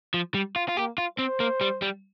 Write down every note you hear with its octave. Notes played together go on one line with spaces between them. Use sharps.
F3
G3
F4
F4
A#3 G4
F4
C4 C5
A#3
G3
G3